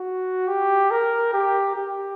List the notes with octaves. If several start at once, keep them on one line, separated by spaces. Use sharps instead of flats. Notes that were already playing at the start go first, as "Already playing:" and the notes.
Already playing: F#4
G4
A#4
G4
G4